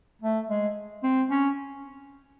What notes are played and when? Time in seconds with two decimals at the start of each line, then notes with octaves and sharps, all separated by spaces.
0.22 A3
0.49 G#3
1.03 C4
1.30 C#4